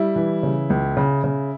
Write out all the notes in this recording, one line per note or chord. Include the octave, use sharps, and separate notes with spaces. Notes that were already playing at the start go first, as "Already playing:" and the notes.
Already playing: G3 E4
E3
C#3
C#2
C#3
C#3